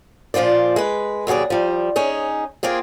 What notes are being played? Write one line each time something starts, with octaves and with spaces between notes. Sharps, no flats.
A#2 F3 F4 C5 D5
G#3 B4
D#2 B2 F#3 G#4 D5
F3 G3
C#4 D#4 G#4
A#3 C4 F4 G#4